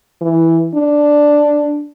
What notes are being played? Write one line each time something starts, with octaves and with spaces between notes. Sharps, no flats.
E3
D4